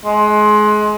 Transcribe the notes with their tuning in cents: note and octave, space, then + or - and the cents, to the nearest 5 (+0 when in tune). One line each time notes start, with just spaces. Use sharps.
G#3 +25